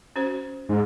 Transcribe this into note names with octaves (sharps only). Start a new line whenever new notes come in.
C#4 F#4 C5
G#2